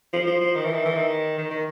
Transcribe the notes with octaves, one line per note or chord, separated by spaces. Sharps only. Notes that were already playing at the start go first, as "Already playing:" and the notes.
F3
F3
F3
D#3
E3
D#3
E3
D#3
D#3
D#3